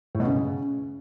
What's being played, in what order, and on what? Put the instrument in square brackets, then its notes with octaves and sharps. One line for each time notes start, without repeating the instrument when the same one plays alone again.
[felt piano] A2
B2
C#3